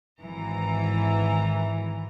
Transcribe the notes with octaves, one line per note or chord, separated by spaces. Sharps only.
G#1 E3 A#5